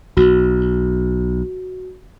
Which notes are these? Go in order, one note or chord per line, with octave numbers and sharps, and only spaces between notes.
B1 F#4